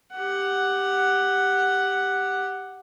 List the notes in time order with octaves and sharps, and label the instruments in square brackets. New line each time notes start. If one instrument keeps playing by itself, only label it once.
[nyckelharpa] G4 F#5